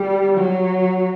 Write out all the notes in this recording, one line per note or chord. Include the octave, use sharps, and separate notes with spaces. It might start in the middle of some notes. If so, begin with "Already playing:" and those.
Already playing: G3
F#3